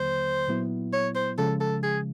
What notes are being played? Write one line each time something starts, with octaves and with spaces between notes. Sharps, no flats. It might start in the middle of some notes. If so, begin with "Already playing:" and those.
Already playing: D#2 D3 F#3 A#3 C5
A#2 F#3 B3 E4
C#5
C5
C#3 F3 G#3 A4
A4
G#4